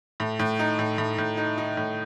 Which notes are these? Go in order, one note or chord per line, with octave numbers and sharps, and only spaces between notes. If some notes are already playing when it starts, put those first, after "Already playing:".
A2
A2
D#4
A2
A2
A2
D#4
D#4
A2